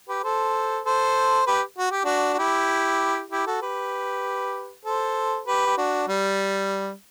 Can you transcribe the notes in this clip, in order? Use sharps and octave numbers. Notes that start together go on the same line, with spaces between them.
G4 B4
A4 C5
A4 C5
G4 B4
F#4
G4
D4 F#4
F#4
E4 G4
E4 G4
F#4 A4
G4 B4
A4 C5
G4 B4
G4
D4 F#4
G3